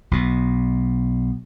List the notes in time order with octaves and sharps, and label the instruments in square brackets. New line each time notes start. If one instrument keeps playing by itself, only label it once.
[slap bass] B1 B2